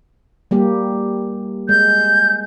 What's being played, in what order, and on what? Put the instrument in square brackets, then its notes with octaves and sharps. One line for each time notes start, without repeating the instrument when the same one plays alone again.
[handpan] G3 A#3 G4
[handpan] G#3 [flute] G6